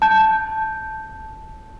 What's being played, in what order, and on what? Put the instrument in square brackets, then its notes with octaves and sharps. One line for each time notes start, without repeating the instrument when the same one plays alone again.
[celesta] A5 G6